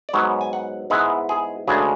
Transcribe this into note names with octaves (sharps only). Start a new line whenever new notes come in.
D5
G#2 F#3 B3 C#5
G#5
F#5
G#2 G#3 B3 E4 F#5
G#4
D2 C#3 G#3 D4 G#4